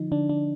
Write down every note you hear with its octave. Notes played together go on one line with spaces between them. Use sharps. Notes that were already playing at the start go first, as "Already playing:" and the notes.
Already playing: D3 F3 D#4
D3 D4
D4